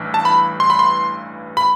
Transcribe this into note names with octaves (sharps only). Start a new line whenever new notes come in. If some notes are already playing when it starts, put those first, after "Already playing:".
Already playing: A1 G2 E3
A5
B5
C6
B5
C6
B5